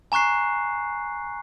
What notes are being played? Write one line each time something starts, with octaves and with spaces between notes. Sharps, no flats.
G#5 A#5 C#6 F#6 C7